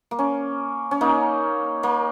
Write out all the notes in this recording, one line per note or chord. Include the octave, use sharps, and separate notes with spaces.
A#3
C#4
C#4
A#3 D#4
A#3